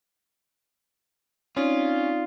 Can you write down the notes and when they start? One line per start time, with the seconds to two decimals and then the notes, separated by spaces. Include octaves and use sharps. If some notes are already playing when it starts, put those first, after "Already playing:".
1.57 C4 C#4 D#4 F4 D5